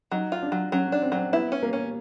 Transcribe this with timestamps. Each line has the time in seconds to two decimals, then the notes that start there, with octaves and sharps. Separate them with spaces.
0.11 F#3 D#4
0.32 F4
0.42 D4
0.52 F#3
0.72 F#3 C#4
0.87 C#4 D4
1.02 C4
1.12 F#3
1.17 C4
1.33 B3 E4
1.52 C#4
1.63 A#3
1.73 C#4